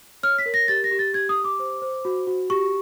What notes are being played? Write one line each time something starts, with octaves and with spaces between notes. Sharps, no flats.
C#5 F6
B6
A#4
A#6
G4 A6
A#6
G4
A6
G4 G#6
D#6
G4
D6
C5
C5
F#4
F#4
G4 C#6